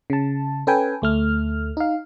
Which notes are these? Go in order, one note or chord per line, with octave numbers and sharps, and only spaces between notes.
C#3 A5
C#4 A4 B4 G5 G#5
D2 A3 F6
D#4 F5